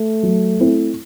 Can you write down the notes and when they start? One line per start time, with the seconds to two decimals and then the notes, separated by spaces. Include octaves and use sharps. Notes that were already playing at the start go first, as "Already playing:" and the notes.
Already playing: A3
0.23 F#3
0.60 C4 E4